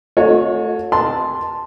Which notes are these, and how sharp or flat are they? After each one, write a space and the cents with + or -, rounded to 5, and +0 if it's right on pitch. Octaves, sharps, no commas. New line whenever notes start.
A3 +0 F#4 -45 C#5 +0
A5 +0 C6 +0